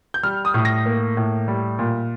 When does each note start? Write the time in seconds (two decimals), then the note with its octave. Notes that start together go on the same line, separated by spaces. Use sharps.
0.14 G6
0.23 G3 F6
0.45 D#6
0.54 A2
0.65 A#6
0.86 A#3
1.17 A2
1.48 G3
1.79 A#2